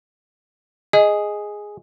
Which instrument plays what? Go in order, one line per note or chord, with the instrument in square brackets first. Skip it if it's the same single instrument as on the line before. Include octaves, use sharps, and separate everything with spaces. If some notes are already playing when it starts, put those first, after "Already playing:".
[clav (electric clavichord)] G#4 [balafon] D#5